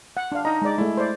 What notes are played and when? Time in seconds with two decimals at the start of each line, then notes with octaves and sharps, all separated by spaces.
0.17 F#5
0.32 D4 F5
0.45 D#4 D#5 A#5
0.62 G#3 D5
0.78 G#3 A3 E4
0.97 C5 D5